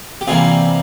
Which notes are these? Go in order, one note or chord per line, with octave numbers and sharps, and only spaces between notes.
G4
C3 E3 G3 A#3 F4 G#4